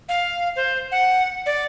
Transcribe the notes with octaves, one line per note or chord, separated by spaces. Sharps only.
F5
C5
F#5
D5